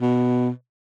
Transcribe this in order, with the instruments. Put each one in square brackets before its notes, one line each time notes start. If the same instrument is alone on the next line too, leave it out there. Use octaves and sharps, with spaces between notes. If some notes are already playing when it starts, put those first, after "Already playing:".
[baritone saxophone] B2